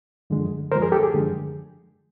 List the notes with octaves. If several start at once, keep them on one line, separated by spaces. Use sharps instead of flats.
F#2 D3 F3 G#3
F#2 D3 F3 G#3 A#4 C5
G#4 A#4
G4 A4
G#4
F#2 D3 F3 G#3